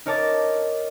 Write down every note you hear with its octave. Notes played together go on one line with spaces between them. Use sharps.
D#4 A#4 C#5 A5 D6 A6